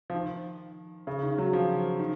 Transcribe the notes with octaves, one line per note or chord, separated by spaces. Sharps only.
F3
D#3
C#3
D#3
F#3
F3
D#3